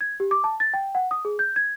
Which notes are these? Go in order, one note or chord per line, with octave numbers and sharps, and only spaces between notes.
G#6
G4
D6
A5
A6
G5
F#5
D#6
G#4
G6
G#6